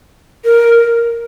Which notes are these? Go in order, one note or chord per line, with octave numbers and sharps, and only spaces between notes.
A#4